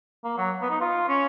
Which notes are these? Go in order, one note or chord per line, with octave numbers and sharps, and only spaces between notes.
A#3
F#3
B3
D#4
F4
C#4